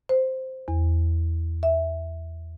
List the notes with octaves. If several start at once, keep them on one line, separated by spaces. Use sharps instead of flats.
C5
E2
E5